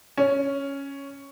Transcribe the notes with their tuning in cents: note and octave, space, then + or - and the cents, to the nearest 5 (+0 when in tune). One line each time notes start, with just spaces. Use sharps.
C#4 +0